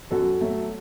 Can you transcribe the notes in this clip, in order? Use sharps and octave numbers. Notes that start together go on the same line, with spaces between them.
F#2 F#4 A4
F#3 A3